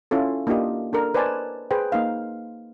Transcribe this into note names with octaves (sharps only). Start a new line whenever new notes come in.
C#4 E4 F4 A4
A#3 D4 E4 F4 G4 D#5
D4 A4 A#4
B4 C5 D5 D#5 G#5 A5
G#4 B4 C5 G5
A#3 D#4 F5